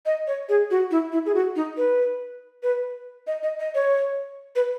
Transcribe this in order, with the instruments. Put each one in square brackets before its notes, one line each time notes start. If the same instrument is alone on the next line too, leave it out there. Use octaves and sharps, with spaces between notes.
[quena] D#5
C#5
G#4
F#4
E4
E4
G#4
F#4
D#4
B4
B4
D#5
D#5
D#5
C#5
B4